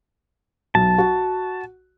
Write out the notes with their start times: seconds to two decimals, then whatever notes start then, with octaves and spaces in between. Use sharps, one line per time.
0.75 B1 A5
0.98 F#4